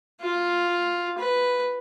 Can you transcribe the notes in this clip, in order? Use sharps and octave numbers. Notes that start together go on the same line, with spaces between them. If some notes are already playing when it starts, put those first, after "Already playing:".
F4
B4